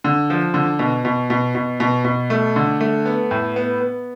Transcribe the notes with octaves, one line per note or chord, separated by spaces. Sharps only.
D3
F3
D3
B2
B2
B2
B2
B2
B2
A3
D3
A3
B3
A2
B3
B3